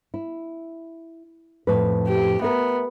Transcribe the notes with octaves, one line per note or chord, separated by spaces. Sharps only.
E4
F2 A2 B4
G4
B3 A#4 E5